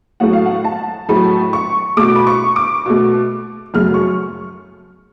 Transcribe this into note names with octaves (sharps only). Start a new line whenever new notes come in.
A2 F#3 A3 F#5
F5
F#5
A5
A2 F#3 A3 B5
C#6
B2 A3 D6
B5
C#6
D6
B2 A3
F#2 C#3 F#3 A3 F6
C#6